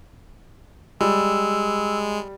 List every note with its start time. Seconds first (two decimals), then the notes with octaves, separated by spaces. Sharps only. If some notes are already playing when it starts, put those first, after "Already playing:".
1.01 G3 G#3 E6